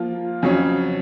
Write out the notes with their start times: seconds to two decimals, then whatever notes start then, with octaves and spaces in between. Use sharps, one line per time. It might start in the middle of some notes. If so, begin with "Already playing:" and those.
Already playing: F3 A#3 F4
0.43 F2 C#3 F#3 C#4